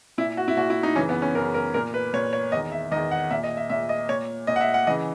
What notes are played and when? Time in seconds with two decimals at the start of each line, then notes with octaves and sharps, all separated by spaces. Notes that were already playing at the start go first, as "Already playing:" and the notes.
0.18 A#2 E4
0.37 F#4
0.48 E4
0.57 A#2 F#4
0.70 E4
0.83 D#4
0.96 F#2 C#3 E3 C#4
1.09 B3
1.22 C#4
1.35 F#2 C#3 E3 A#4
1.54 A#4
1.74 A#2 A#4
1.94 B4
2.13 A#2 C#5
2.33 C#5
2.52 E2 D#3 D#5
2.72 E5
2.91 D#3 D#5
2.96 E2
3.11 F#5
3.31 A#2 E5
3.44 D#5
3.57 E5
3.70 A#2 E5
3.89 D#5
4.09 A#2 C#5
4.47 A#2 D#5
4.56 F#5
4.61 E5
4.74 F#5
4.87 C#3 E3 D#5